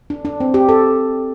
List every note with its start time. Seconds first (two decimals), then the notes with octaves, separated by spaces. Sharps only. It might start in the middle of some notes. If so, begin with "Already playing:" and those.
0.10 D4
0.25 D4
0.40 C4
0.54 G4
0.69 A4